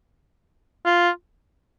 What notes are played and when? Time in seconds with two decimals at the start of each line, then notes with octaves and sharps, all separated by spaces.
0.86 F4